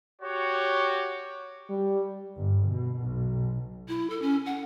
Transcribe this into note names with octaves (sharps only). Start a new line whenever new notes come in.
F#4 G4 C#5
G3
G1
B2
B1
E4
A4
C#4
F#5